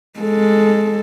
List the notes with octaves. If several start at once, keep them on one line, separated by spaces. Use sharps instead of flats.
G#3 A4